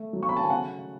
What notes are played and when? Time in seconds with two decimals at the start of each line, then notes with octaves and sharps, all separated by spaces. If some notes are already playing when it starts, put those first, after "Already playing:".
Already playing: A3
0.13 F#3
0.23 C#6
0.29 B5
0.37 A5
0.44 G#5
0.50 C#3 F#5